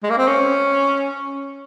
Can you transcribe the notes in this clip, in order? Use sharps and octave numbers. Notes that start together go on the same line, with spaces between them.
G#3
A#3
C4
C#4